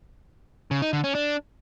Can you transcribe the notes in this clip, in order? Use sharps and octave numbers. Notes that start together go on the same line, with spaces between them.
C#3
D#4
D3
C#4
D4